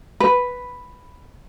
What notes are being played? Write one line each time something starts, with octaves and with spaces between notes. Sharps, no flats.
B4